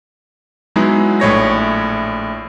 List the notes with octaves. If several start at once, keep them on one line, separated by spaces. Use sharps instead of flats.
F#3 G#3 B3 D#4 E4 G#4
A#1 A2 C#5 A#6